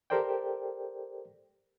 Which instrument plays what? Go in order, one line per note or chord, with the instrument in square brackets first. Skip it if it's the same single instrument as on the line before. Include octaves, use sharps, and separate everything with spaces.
[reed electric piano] G4 A4 A#4 C5 D5 G5